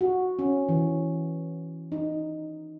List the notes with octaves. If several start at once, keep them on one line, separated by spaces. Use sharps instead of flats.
F#4
C#4
E3
D#4